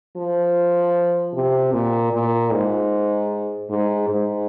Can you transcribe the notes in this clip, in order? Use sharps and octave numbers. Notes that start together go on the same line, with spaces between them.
F3
C3
A#2
A#2
G#2
G#2
G#2